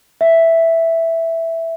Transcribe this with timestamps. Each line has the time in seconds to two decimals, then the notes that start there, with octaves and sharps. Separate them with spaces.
0.21 E5